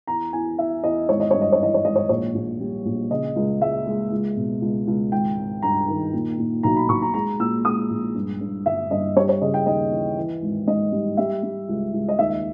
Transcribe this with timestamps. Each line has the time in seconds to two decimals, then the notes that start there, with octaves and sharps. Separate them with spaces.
0.07 E2 A#5
0.33 E2 G#5
0.58 E2 E5
0.84 E2 D#5
1.09 G#1 C#5
1.20 D#5
1.31 G2 C#5
1.41 D#5
1.53 C#5
1.59 E3 D#5
1.74 C#5
1.84 G#1 D#5
1.96 C#5
2.09 A#1 C#5
2.35 A#1
2.60 G3
2.85 A#1
3.11 C#3 D#5
3.36 C#2
3.61 G#3 E5
3.87 G#3
4.12 C#2
4.37 B2
4.62 C#2
4.87 C#2
5.12 G#1 G5
5.37 G#1
5.62 G2 A#5
5.88 D#3
6.13 A#2
6.38 A#2
6.63 B1 A#5
6.77 B5
6.89 B1 C#6
7.02 A#5
7.14 G#3 A#5
7.40 A#2 E6
7.65 G#3 D#6
7.90 A#1
8.15 G2
8.40 G2
8.66 G1 E5
8.91 G2 D#5
9.16 G3 C#5
9.29 C#5
9.41 C#3 D#5
9.54 G5
9.66 D#2 D#5
9.91 E3
10.17 E3
10.42 G#1
10.67 G#2 D#5
10.92 G3
11.17 G3 E5
11.43 G3
11.69 C#2
11.94 C#2
12.09 D#5
12.19 D#2 E5